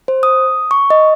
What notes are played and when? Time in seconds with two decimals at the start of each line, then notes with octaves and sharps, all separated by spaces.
0.08 C5
0.23 D#6
0.71 C#6
0.90 D#5